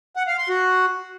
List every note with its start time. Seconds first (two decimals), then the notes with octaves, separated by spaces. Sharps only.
0.16 F#5
0.27 F5
0.38 C6
0.49 F#4